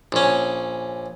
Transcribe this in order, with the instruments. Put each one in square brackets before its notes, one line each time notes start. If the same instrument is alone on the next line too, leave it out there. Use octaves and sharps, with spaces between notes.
[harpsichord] A#1 C#4